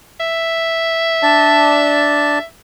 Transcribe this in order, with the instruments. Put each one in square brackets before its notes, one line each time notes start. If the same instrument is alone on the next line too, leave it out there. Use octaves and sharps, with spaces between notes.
[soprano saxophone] E5
[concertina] D4 D5 A5